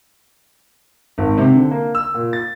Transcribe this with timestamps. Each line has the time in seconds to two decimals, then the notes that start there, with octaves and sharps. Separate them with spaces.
1.18 G#1
1.38 C3
1.55 D3
1.71 A#3
1.95 E6
2.14 A#2
2.33 A6